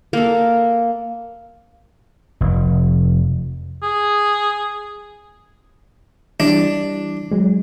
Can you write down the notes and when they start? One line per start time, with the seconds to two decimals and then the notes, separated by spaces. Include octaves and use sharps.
0.13 A#3 A4
2.41 F1
3.83 G#4
6.40 E3 G3 D4
7.32 F#3 G#3